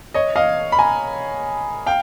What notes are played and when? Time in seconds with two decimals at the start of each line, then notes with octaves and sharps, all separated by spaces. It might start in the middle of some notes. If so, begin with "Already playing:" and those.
0.14 C#5 D#5
0.36 D#5 F5
0.72 B5
0.79 G#5 A#5
1.86 F5 G5